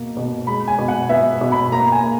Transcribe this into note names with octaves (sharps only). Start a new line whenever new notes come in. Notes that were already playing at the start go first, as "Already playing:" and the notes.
Already playing: B2 A#3
B2
G#3 B5
G#5
B2
F#5
B3 E5
B2
B5
A#3 A#5
G#5
A#3